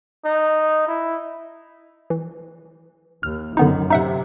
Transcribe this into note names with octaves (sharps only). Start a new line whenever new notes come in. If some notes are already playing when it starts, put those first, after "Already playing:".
D#4
E4
E3
D#2 F6
F#2 D3 D#3 B3 D#4
C3 D#4 E5 F#5